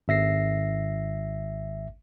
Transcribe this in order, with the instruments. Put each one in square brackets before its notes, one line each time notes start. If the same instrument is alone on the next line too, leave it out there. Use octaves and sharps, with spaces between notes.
[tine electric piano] G#1 E5 A#6 C7